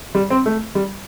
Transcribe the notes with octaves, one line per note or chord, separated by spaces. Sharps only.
G3
C4
A3
G3